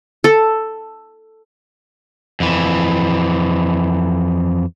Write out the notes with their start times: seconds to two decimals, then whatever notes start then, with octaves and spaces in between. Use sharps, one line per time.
0.24 A4
2.40 F2 E3